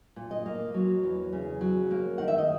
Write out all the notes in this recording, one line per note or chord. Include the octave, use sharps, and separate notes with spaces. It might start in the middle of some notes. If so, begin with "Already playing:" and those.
A#2
D#5
A#3
F#3
E2
C#3
F#3
A#3
D#3 F#5
E5
D#5